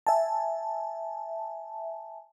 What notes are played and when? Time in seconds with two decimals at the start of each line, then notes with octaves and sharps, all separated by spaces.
0.07 E5 G#5 A5